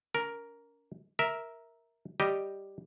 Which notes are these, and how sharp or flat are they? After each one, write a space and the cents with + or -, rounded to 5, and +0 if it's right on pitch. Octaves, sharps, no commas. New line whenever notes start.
C#4 +40 A#4 +0
A#4 +0 E5 -10
G3 +0 G4 +0 D#5 +0